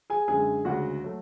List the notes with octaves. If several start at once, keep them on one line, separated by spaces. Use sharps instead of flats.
G#4 G#5
F#2 D3 G#3 G#4 G#5
D2 C#3 G#3 F#4 F#5
F#3 A3